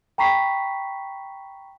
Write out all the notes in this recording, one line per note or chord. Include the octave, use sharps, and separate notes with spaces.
G5 A#5 B5 C#6 B6 C7